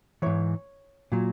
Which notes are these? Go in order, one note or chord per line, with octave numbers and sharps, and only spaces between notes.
G#2 E3 C#5
A#2 F#3